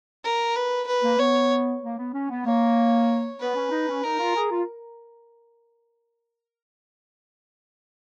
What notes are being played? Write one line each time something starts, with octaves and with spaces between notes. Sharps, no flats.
A#4
B4
B4
A#3
B3 C#5
A#3
B3
C#4
B3
A#3 C#5
B3 B4
C#4
D#4
C#4
D#4 A#4
F4
G#4
F4